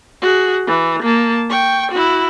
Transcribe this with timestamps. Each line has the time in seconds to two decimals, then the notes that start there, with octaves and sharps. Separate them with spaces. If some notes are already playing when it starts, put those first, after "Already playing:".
0.22 F#4 G#4
0.67 E3
1.02 A#3 A5
1.50 G5 C#6
1.91 E4 F#4